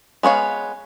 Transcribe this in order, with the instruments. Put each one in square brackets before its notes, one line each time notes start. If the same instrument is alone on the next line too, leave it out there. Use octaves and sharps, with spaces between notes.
[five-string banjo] G#3 B3 C#5 F5